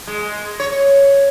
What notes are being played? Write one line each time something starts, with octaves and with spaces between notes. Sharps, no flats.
G#3
C#5